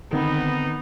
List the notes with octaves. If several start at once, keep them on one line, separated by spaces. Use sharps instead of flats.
D3 D#3 B3 C4 D#4